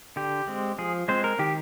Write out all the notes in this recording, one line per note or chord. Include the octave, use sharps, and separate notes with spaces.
D3 G4
G#3 C4
F3 G#4
G#3 C4 C5
A#4
D#3 G4